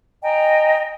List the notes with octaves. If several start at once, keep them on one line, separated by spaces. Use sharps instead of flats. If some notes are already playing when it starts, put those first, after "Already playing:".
D#5 G5 G#5 A#5